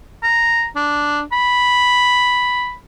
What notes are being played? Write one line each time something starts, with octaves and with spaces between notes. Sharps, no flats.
A#5
D4
B5